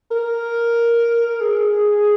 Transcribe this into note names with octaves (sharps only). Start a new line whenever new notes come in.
A#4
G#4